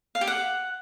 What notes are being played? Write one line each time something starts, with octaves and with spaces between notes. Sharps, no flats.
F5
G4
F#5